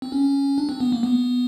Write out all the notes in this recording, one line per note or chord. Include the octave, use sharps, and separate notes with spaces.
C4
C#4
D4
C4
B3
A#3
B3